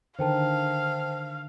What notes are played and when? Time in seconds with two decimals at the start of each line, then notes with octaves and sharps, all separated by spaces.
0.19 D3 D#3 A#4 C5 F5 G5 A5